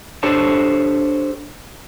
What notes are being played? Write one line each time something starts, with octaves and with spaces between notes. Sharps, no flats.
D4 G4 A4 C5 C#5 A5